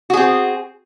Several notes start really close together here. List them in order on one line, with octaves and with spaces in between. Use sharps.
F#4 G#4 C4